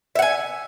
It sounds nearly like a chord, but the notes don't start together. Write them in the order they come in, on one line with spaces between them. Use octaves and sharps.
E5 F#5 G#5